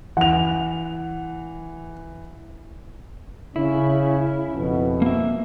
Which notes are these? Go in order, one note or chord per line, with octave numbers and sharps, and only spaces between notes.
E3 F#5 F7
C#3 C#4 E4
F2 B2
A#3 E5